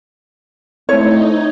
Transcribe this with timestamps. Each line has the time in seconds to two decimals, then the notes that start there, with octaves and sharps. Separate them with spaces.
0.89 A3 C4 D#4 E4 C#5